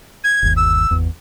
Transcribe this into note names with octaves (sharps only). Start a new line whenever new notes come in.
G#6
G1 D#2
E6
G#1 E2